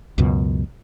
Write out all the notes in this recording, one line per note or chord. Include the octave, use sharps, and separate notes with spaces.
C#2 F#2 B2